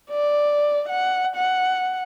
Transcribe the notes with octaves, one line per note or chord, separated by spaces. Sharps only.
D5
F#5
F#5